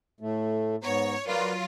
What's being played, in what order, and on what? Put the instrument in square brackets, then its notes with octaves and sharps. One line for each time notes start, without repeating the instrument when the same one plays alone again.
[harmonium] A2 A3
[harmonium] G#2 B3 A#5 [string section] C#5
[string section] F#3 F4 [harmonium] A#4 B4 D5